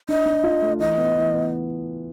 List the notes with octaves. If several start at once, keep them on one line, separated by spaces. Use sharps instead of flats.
D4 D#5
D4
F4
A3
E3 D#5
B3
E3
B3